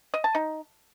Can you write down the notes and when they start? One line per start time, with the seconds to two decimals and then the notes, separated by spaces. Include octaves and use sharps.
0.14 D#5
0.24 A5
0.35 D#4